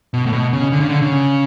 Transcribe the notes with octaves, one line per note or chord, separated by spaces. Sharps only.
B2
A2
B2
C#3
D3
C#3
D3
C#3